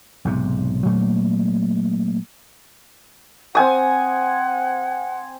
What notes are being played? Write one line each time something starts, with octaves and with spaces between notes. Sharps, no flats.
B1 G#2 C3
A#2 F#3 A3 A#3
C4 F#5 G#5 D#6